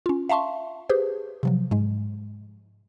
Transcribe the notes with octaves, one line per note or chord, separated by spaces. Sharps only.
C#4 F4
E5 F5 A5 C6 C#6
G4 G#4 B4 C5
C3 F3 F#3
G#2 G#3